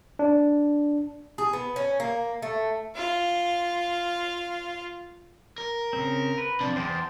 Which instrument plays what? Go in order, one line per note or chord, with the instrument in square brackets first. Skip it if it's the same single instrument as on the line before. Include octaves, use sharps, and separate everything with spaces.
[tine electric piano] D4
[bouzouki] G#4
B3
C#4
A#3
A3
[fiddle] F4 F5
[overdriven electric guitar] A#4
[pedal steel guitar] C#3 C4
B4
[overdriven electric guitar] F2 C3 [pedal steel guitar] D4
[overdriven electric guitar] E2 [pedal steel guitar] C5 G5 A5